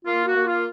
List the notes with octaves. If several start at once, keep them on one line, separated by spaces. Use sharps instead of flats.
A#3 F4
F#4
A#3
F4